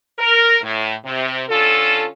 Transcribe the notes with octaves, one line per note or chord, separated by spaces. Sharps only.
A#4
A2
C3
D3 C#4 F4 A4